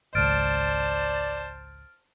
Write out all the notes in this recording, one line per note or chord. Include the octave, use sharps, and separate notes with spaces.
G#1 C#2 C5 D5 A5 F6 A6 D7